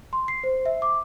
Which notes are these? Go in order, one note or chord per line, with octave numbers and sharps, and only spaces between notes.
C6
C7
C5
E5
D6